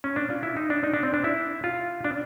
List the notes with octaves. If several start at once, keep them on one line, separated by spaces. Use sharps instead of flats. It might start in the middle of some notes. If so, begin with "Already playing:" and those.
C#4
D4
F4
E4
D#4
D4
D#4
D4
C4
D4
E4
F4
D4